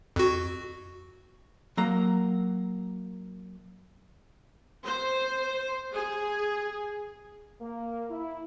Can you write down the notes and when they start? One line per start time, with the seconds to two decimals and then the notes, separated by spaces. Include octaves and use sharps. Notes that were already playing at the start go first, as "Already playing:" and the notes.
0.16 F2 F#4
1.77 F#3 A#3 A#5
4.84 C5
5.92 G#4
7.61 A#3
8.10 E4